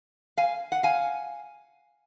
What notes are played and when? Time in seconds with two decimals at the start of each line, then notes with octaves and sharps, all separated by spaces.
0.37 F5 G#5
0.72 F#5
0.83 F5 G#5